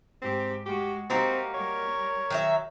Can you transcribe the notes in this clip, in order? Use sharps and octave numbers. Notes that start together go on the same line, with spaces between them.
G#2 C4 G4
G#3 F#4 G4
G3 A#3 C4 D#4 F#4 G4
G3 A#4 C#5
D#3 F#3 E5